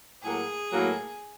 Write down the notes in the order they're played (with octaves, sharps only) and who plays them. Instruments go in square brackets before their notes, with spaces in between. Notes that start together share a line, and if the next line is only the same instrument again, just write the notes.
[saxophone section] A2 F#3 A#3 [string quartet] G#4
[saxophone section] A2 F#3 A#3